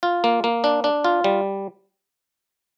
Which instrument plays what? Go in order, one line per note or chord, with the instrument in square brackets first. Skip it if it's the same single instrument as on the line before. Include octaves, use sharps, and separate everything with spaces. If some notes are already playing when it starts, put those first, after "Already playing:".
[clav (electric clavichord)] F4
A#3
A#3
D4
D4
F4
G3